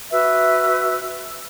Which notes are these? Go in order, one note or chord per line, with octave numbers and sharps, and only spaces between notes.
F#4 B4 E5 E6